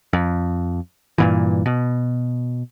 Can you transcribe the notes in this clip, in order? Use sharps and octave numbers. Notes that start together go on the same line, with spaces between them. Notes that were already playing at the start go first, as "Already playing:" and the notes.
F2
G2 A#2 E3
B2